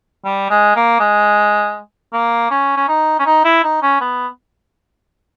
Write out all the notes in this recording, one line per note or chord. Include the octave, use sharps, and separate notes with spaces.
G3
G#3
A#3
G#3
A#3
C#4
C#4
D#4
C#4
D#4
E4
D#4
C#4
B3